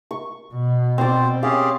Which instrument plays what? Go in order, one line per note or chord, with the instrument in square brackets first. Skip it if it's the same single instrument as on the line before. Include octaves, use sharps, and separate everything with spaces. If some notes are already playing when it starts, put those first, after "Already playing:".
[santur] C#6
[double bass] B2
[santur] C4 D5 [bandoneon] C5
[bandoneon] C#4 G4 G#4 [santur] F5